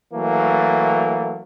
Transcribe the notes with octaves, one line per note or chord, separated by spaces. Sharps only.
E3 F#3 A3 A#3